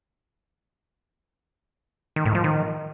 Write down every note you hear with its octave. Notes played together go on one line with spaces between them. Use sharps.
D#3
A2
F3
D#3